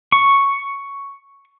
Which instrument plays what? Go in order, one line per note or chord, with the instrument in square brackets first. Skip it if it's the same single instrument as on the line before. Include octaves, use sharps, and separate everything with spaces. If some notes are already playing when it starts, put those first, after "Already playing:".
[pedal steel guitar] C#6